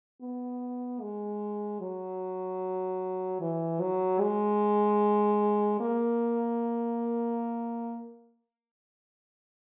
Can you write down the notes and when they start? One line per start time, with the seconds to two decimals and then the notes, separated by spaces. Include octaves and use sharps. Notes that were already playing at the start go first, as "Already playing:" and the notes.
0.21 B3
1.01 G#3
1.81 F#3
3.41 E3
3.80 F#3
4.21 G#3
5.80 A#3